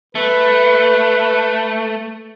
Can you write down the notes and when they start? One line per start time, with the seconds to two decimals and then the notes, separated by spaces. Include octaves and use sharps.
0.15 A3 B4